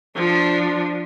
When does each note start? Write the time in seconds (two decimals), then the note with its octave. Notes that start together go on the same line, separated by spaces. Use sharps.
0.16 F3 D4